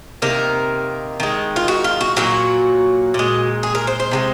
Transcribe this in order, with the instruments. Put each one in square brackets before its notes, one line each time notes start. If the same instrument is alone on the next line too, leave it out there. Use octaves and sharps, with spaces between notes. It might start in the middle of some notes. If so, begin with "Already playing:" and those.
[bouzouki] C3 D#3 A#3 A#4
D#3 G#3
F4
F#4
F4
F#4
A#2 F#3 A#3 F#4
A#2 G#3
G#4
A#4
C5
C5
C3 F3 G#3